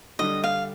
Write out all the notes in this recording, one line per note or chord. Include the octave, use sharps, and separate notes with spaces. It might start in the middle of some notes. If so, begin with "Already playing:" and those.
D3 G3 D4 D#5
F5